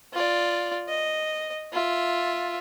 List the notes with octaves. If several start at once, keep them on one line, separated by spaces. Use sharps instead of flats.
F4 D5
D#5
F4 E5